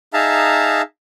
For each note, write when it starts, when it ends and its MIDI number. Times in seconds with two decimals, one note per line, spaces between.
0.13 0.82 63
0.13 0.82 68
0.13 0.82 76
0.13 0.82 77
0.13 0.82 81
0.13 0.82 82